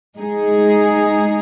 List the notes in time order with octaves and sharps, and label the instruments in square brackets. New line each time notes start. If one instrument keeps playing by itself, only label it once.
[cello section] G#3 D#4 G#4